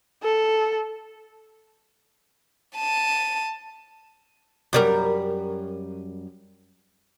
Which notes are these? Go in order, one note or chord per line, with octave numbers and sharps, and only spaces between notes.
A4
A5 D#7
F#2 G3 A#4